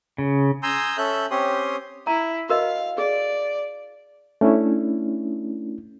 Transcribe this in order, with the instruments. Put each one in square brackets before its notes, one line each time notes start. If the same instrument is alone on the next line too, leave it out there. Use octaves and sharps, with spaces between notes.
[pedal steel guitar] C#3
[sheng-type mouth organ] G#5 A#5 C6 D#6 E6 G6
C#4 A4 E5 F#6 G6
C4 C#4 G4 C#5 C6 D#6
[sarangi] E4 [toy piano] A#5
[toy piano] F#4 A#4 D#5 [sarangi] F5
[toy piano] G#4 [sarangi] D5
[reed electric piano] A3 C#4 D4 E4